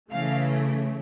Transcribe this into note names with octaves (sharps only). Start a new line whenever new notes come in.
C#3 E3 A3 F5